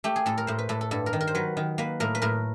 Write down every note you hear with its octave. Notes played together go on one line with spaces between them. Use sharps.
A3 G4
G#4
A2 A4
A#4
A2 C5
B4
A2 A4
A4
G2 A4
A#4
D#3
A#4
C5
F#3 B4
D#3
A#3 B4
A2 A#4
B4
A2 A#4